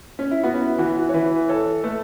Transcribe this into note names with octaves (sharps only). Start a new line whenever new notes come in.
C#4
E4
B3 F#4
C#4
E4
E3 F#4
F#4
C#5
E3 B4
A4 C#5
A3 B4